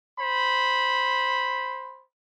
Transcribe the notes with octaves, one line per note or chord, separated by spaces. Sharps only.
C5 B5